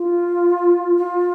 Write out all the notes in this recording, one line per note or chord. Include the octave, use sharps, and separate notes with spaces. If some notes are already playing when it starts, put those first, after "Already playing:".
Already playing: F4
F4